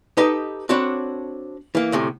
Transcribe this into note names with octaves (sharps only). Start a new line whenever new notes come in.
D#4 G4 A4 B4 D#5
C4 D4 F#4 A4 C#5 B5
E3 A#3
D2 A2 C3